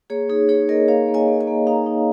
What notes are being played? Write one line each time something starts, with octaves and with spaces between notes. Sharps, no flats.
A#3 G#4 C#5
D#4 G#4
D#4 G#4 C#5
A#3 A#4 D#5
A#3 C#5 F5
A#3
D#5 G#5
A#3
D#5 G#5
A#3
D#4 F5 A#5
D#4